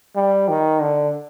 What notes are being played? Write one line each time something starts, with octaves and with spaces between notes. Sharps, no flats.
G3
D#3
D3